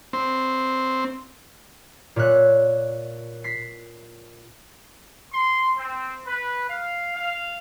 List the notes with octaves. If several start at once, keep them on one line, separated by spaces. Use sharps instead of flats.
C4
A#2 C#5 E5 F#6
B6 C7
C6
C4
B4
F5
F5